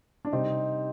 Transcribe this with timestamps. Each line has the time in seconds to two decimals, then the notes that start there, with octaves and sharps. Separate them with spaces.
0.25 D4
0.32 C3 G3 C4 D#4